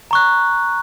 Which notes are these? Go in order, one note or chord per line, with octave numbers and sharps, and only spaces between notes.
A#5 C#6 F#6